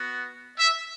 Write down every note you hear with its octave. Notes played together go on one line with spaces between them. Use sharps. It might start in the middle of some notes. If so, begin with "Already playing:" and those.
Already playing: B3 F#4
E5